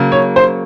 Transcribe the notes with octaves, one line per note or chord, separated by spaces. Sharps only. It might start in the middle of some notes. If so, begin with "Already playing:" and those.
Already playing: C#3 F#3 A#3
C#5
C5